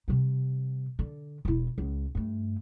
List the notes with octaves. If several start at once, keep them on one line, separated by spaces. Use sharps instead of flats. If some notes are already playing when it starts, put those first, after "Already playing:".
C3 G3
D3
E1 E4
C#2
G2 A3